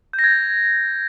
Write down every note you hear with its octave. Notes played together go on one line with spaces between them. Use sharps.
G6
A#6
G#6